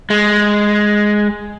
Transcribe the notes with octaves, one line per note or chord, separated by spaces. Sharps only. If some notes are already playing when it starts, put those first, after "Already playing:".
G#3